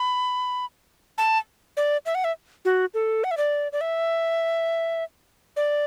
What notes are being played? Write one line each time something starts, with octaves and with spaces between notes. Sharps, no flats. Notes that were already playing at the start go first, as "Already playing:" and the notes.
Already playing: B5
A5
D5
E5
F#5
E5
F#4
A4
F#5
E5
D5
D5
E5
D5